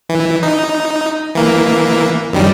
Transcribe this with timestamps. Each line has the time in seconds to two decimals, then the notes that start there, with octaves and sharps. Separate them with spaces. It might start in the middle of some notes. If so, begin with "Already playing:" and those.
0.09 E3
0.43 D#4
1.35 E3 A#3
2.33 F#2 D#3 G3